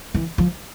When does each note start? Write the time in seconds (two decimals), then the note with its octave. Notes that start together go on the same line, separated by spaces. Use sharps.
0.15 E3
0.38 F3